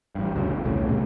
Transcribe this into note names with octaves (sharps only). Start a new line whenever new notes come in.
A1 G2
D2 G2 C#3
G1
E1 C2 A2 C#3
C2 A2 C#3